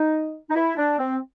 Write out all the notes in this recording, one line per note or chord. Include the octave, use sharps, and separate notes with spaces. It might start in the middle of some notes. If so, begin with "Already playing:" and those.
Already playing: D#4
D#4
E4
D4
C4